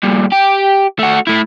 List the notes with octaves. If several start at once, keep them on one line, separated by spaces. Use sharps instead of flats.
G2 A#2
G4
A3 F#4
A3 E4